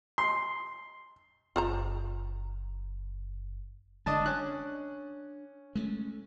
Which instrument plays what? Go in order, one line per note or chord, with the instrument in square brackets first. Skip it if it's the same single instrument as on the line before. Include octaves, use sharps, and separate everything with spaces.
[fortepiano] C6
[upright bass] F#1 [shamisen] F4 C5 A#5
[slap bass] F#1 D3 G#3 [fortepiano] D4 D#5 A5
[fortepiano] C#4 F#6 [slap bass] D4
[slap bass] G#3 A3 C#4